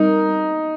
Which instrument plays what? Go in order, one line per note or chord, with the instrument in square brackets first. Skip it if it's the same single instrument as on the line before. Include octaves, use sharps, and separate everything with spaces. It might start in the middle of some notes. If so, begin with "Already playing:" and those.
Already playing: [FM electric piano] G3 C4 A#4 [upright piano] D#4